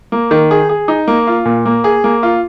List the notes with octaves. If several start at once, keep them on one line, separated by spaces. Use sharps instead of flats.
A#3
D#3
G#4
G#4
D#4
A#3
F4
A#2
A#3
G#4
A#3
F4